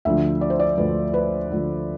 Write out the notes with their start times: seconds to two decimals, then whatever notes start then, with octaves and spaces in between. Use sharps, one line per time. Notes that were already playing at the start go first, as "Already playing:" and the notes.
0.05 D2 D3 F3 E5
0.41 D5
0.50 C5
0.59 D5
0.78 D2 D3 F3 B4
1.14 B4
1.50 D2 D3 F3